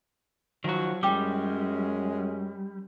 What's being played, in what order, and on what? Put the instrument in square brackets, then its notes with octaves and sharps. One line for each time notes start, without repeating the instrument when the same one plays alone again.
[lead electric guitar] D#3 F#4 [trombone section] F3 F#3
[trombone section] F#2 G#3 C#4 [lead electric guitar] G3 [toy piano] E4 G5 D6